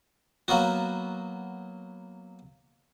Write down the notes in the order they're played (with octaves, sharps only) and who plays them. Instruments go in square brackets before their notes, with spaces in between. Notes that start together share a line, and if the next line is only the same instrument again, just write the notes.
[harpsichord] F#3 A#3 B3 F#4